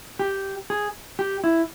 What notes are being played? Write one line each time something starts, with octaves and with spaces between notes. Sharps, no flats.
G4
G#4
G4
E4